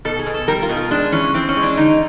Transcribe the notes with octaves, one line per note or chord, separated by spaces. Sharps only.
B2 A4
G#4
B2
A4
G3 A#4
F4
B2
F4
G#3 D4
E3 C#4
E3 C4
C#4
G#3
D4
D3 D#4